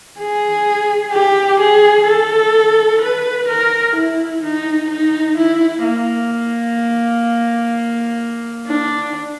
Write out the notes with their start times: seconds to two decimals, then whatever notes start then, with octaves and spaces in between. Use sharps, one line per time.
0.19 G#4
1.12 G4
1.60 G#4
2.07 A4
3.02 B4
3.48 A#4
3.96 E4
4.43 D#4
4.90 D#4
5.37 E4
5.84 A#3
8.67 D4